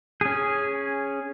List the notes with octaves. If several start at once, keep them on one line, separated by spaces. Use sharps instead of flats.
C#4 G#4